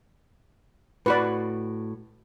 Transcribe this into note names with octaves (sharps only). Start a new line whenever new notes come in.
A2 F#4 B4 D5 B5